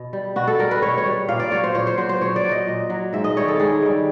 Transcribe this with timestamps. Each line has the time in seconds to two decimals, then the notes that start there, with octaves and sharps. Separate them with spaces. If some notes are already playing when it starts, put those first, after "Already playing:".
Already playing: B2
0.13 G3
0.36 B2 F#4
0.47 A4
0.59 G3 A#4
0.71 B4
0.82 B2 C#5
0.98 C#5
1.06 G3
1.28 A#2 F5
1.39 D5
1.52 F#3 C#5
1.63 C5
1.75 A#2 C#5
1.87 C5
1.97 F#3 C5
2.09 C5
2.21 A#2 C#5
2.36 D5
2.44 F#3
2.52 D#5
2.68 A#2
2.90 F#3
3.13 G#2 E5
3.24 D#5
3.37 D#3 G3 C#5
3.48 A4
3.59 G#2 G#4
3.82 D#3 G3